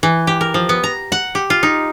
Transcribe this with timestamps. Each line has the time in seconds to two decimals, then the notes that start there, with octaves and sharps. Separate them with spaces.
0.03 E3
0.27 G4
0.41 A#4
0.54 F3
0.69 B3
0.84 A#5
1.12 F#5
1.35 G4
1.50 F4
1.63 D#4